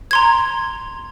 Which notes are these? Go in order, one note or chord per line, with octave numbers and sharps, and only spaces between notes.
A#5 C6 G#6